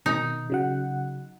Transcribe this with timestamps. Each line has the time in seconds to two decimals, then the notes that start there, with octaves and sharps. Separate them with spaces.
0.06 B2 D#3 D#4
0.50 C#3 F#3 F#5